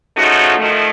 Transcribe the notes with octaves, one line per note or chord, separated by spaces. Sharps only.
C#3 F3 A3 D#4 F#4
D#3 F3 A3